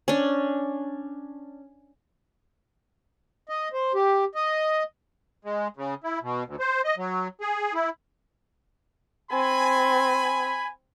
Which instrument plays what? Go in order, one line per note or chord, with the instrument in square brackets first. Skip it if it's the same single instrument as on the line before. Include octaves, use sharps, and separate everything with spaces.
[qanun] C#4 D4
[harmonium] D#5
C5
G4
D#5
[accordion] G#3
C#3
E4
B2
D2
C5
D#5
F#3
G#4
E4
[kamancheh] C4 [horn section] G#5 B5